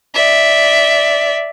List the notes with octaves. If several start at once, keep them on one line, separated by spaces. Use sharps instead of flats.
D5 E5